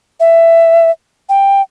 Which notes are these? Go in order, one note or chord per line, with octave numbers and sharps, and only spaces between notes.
E5
G5